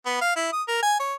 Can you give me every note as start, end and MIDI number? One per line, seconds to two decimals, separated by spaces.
0.06 0.17 59
0.21 0.36 77
0.36 0.50 64
0.53 0.63 87
0.68 0.80 70
0.82 0.95 80
1.00 1.14 73